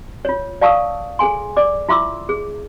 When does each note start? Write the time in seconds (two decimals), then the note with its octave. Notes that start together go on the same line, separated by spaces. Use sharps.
0.25 F4 C#5
0.61 D5 F5 A5 C#6 D#6 E6
1.19 G#4 A4 G#5 C6
1.57 D5 D6
1.89 E4 F4 E5 C6 D6 E6
2.29 G#4